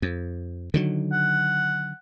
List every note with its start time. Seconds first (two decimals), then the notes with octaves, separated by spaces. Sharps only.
0.02 F2
0.74 D3 D#3 F#3
1.13 F#5